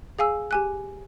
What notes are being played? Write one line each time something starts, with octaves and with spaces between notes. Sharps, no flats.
G#4 F5 G#5 E6
G4 G#5 F#6